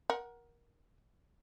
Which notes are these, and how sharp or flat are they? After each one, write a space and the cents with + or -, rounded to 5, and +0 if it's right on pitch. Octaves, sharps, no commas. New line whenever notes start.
A#4 +20 F#5 +0